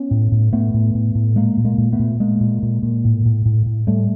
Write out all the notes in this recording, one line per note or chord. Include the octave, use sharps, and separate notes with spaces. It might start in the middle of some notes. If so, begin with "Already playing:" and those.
Already playing: B3 C#4
A2
A2
A2 A3 B3
A2
A2
A2
A#2 G#3 A#3
A#2
G#3 A#3
A#2
A3 B3
A#2
A#2 G#3 A#3
A#2
A#2
A#2
A2
A2
A2
A2
A2 G3 A3